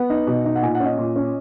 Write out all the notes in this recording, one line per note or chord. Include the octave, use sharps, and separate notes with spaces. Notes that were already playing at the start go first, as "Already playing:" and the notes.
Already playing: B3 F#5
D#4
B2
D#4
F#5
A#2 G#5
F#5
C#4
D#5
A#2
C#4